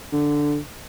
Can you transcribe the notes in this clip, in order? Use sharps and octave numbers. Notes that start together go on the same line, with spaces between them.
D3